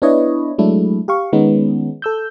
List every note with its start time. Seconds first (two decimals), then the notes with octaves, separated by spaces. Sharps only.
0.02 B3 D4 E4 B4 C#5 D#5
0.58 F#3 G#3 A3 D4 E4
1.08 G4 F5 C#6
1.33 D#3 G#3 B3 C#4 D#4
2.02 A4 E6 G6